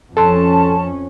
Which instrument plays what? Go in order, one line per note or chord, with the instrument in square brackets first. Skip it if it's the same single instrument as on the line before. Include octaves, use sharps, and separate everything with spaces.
[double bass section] F2 C#4 [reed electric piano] A4 C6 [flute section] A5